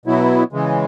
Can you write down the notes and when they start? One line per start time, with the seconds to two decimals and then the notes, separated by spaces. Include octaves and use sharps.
0.06 B2 F#3 B3 E4
0.53 C#3 E3 G#3